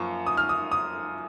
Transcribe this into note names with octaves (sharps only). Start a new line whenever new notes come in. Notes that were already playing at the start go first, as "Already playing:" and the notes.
Already playing: F#2 F3 A#3 C#6
D#6
F6
D#6
D#6